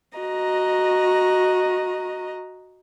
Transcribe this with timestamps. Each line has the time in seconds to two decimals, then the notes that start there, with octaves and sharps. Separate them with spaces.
0.19 F#4 D#5 A#5